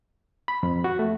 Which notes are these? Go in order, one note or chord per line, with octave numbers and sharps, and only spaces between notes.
B5
F2
F#4
A3